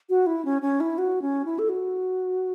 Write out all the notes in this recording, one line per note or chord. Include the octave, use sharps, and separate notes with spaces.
F#4
E4
C#4
C#4
E4
F#4
C#4
E4
A4
F#4